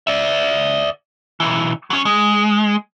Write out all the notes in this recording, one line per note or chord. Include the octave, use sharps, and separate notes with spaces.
D5 E5
B1 E3
F#3 C#4
G#3